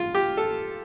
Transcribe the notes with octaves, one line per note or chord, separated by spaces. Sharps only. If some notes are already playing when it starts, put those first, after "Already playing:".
Already playing: F4
G4
A4